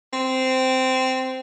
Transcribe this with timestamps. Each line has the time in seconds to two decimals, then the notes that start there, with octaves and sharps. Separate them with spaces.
0.13 C4